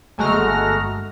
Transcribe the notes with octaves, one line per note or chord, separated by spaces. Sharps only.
G1 G#3 A3 F#4 A#5 F6